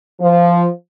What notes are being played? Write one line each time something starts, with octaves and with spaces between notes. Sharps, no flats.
F3